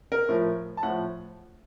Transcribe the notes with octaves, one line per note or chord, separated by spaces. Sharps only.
A#4
A2 F3
A5
A2 F#5
F3